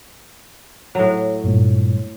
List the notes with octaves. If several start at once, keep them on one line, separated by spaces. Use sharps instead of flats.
A2 F#3
G2 A#2